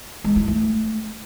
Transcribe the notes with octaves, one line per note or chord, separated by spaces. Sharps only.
G#3
E4
A3